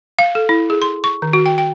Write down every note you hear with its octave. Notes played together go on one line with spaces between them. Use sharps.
F5
A4
E4
G#4
C6
C#6
D#3
F#4
G5
G5